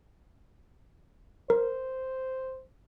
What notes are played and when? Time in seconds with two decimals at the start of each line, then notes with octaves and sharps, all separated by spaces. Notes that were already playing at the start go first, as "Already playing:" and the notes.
1.50 A#4 C5